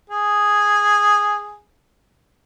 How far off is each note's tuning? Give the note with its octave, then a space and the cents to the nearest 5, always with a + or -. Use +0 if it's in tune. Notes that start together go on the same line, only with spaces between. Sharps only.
G#4 -5